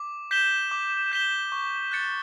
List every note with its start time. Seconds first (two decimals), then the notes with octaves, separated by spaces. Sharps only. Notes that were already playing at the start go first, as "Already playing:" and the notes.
Already playing: D6
0.31 G6 B6 E7 G7
0.71 D6
1.12 G6 B6 E7 G7
1.52 C#6
1.92 F#6 A6 C#7